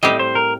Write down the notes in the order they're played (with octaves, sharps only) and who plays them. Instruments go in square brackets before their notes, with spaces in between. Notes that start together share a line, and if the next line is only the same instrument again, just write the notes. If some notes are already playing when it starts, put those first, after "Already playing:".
[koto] A2 G3 C4 G4 [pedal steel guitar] D#5
[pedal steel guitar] C5
A#4